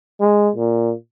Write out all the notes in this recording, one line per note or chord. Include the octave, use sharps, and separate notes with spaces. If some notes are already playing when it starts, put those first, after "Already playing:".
G#3
A#2